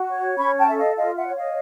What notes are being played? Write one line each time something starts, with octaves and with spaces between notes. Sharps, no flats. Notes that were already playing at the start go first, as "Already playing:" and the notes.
Already playing: F#4
C#5
C#4 B5 C#6
G5 A5
A4 E5
D#5 F5
F4 D#5 F5
E5 F#5
C#5
D#5 F5